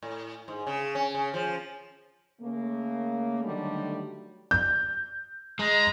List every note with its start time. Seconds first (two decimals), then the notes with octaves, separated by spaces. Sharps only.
0.02 A2
0.48 G#2
0.67 C#3
0.95 C#4
1.14 C#3
1.34 F3
2.42 C#3 A3 A#3
3.43 D3 D#3 F#3 G3 A3
4.51 G6
5.59 G#3 A#5